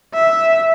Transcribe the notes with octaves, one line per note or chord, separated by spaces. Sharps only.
E5